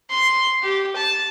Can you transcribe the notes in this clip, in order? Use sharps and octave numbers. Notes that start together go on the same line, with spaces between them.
C6
G4
A5